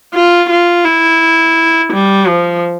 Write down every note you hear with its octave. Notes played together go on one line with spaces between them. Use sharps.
F4
F4
E4
G3
F3